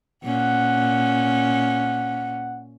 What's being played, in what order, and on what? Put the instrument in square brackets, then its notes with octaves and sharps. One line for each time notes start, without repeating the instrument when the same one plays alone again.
[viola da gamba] A#2 C#4 [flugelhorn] F#5